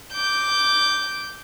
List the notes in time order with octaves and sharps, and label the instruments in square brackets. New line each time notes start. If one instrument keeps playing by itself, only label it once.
[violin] D6 G6